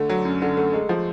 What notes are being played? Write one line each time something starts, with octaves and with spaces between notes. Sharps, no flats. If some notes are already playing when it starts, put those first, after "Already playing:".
Already playing: D3 A3
F#3
F#2
D3
A3
G#3
F3